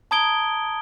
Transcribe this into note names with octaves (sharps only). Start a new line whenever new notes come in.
A5 A#5 D#6 G#6 D7 G7